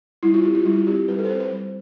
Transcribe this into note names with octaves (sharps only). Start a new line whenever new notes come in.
G3 E4
F4
C4 G4
F4
G3 E4
F4
C4 G4
G3 B4
A4
C5
C4 B4
C5
G3